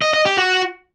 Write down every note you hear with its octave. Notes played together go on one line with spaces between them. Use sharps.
D#5
D#5
G4
F#4